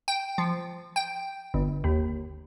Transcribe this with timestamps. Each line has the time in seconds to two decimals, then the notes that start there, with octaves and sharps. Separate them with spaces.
0.08 G5
0.38 F3
0.96 G5
1.54 G1
1.84 D#2